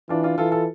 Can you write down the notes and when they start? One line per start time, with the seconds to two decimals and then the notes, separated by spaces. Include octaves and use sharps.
0.09 E3 D4 F4
0.23 D4 F4
0.38 E3 F4 A4
0.52 F4 A4